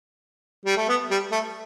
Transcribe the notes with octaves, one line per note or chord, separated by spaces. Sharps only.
G3
A3
B3
G3
A3